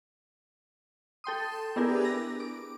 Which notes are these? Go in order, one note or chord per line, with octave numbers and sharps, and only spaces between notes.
A4 G5 C6 D#6
B3 D4 E4 G4 G#4 A#4
A#6
D6